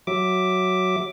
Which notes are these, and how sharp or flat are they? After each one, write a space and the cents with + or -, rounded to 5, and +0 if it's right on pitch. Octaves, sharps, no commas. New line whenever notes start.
F#3 +0 E5 +0 D6 +0